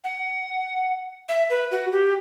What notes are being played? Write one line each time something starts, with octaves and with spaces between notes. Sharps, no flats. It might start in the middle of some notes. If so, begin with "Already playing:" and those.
F#5
E5
B4
F#4
G4